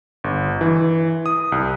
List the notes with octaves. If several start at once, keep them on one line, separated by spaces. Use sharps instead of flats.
G1
E3
D#6
C2